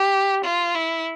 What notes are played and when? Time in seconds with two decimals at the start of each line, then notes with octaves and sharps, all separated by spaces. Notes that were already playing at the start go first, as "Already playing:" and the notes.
Already playing: G4
0.44 F4
0.75 E4